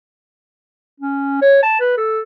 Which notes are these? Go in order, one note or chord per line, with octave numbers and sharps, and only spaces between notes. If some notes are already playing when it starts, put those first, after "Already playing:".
C#4
C#5
A5
B4
A4